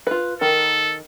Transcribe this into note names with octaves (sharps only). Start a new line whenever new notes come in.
F4 B4
D#3 A4 A#4